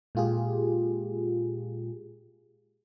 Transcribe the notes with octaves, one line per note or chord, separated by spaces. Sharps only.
A#2 G#3 F4 G4 G#4